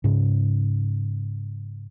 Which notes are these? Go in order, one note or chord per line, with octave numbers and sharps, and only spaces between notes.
G#2 C#3